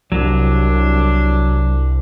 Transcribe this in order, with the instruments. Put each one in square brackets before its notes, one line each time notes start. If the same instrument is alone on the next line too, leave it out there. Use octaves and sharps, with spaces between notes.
[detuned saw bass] C2 [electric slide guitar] F#3 [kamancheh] D4